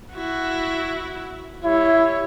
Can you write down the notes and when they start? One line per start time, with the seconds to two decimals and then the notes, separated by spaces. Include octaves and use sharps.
0.14 E4 F#4
1.64 G3 E4 C#5